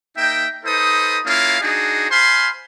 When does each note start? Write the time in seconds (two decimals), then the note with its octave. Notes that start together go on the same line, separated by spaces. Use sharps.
0.17 A#3 D#4 E5 G5
0.65 D#4 A4 B4 C5 D#6
1.25 A#3 C#4 E4 F4 F5
1.60 D4 D#4 F#4 G#4
2.10 C5 F5 G#5 B5 C6